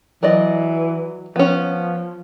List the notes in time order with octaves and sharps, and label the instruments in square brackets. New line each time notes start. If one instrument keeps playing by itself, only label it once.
[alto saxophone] E3 [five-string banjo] F#3 D5 D#5
[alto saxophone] F3 [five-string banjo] B3 C#4